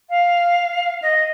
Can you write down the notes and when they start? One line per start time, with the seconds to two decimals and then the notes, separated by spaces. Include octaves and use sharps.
0.10 F5
1.02 D#5